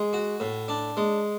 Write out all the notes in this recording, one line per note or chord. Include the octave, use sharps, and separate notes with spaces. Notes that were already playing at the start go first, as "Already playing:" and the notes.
Already playing: G#3
F#4
A2
D4
G#3